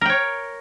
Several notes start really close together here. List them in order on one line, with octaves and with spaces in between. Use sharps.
A#4 G5 C#5